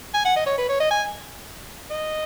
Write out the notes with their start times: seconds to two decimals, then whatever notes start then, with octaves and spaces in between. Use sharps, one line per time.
0.14 G#5
0.25 F#5
0.36 D#5
0.47 C#5
0.58 B4
0.69 C#5
0.80 D#5
0.91 G#5
1.90 D#5